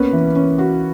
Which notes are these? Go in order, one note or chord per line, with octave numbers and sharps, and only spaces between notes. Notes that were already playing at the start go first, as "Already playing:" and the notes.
Already playing: A#3 B3 C#4 B4
E3
C#4
F#4